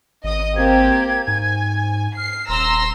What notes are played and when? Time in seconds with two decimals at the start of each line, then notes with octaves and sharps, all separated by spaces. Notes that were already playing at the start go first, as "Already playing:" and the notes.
0.24 G#1 D#5 D#6
0.56 A#3 C4 G4 G#6
1.28 G#2 G#5
2.17 F6 C7
2.49 D#1 A#5 C6 E6 A#6